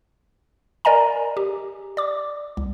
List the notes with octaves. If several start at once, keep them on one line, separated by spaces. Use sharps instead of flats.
A#4 D5 D#5 G#5 A#5
G4
D5 D6
C2